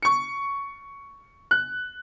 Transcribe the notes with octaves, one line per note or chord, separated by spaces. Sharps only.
C#6 C#7
F#6